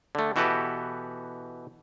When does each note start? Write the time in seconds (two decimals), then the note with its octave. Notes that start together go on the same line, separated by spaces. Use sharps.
0.15 D3 A3
0.36 B2 E3 F#4 G4 A4 B4